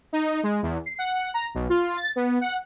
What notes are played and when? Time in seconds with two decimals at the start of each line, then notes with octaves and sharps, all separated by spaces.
0.13 D#4
0.43 G#3
0.63 E2
0.86 C7
0.99 F#5
1.34 A#5
1.55 B1
1.70 F4
1.97 A6
2.16 B3
2.41 F#5